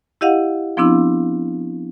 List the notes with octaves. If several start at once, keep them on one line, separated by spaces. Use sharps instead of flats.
E4 G4 D#5 F5 F#5
F3 B3 C4 D4 E4